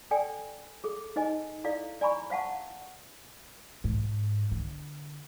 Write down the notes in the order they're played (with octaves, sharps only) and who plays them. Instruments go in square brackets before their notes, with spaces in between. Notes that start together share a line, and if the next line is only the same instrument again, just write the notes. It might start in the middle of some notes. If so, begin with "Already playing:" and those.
[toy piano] A4 D5 G5 G#5
G#4 A4
D#4 C5 D#5 G#5
E4 A4 D5 F5
D5 G#5 A#5 B5 C#6
C5 F5 F#5 A5 C#6
[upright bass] G#2
D3